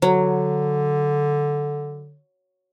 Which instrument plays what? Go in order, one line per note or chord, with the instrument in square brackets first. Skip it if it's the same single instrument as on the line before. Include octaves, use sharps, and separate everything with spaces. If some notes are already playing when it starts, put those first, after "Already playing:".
[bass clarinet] D3 [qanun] F#3